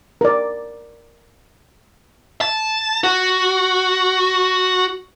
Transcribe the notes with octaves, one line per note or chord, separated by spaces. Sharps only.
A#4 D5
A5
F#4